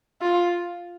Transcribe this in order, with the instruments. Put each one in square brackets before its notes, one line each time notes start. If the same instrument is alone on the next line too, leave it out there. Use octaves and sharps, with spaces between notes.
[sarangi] F4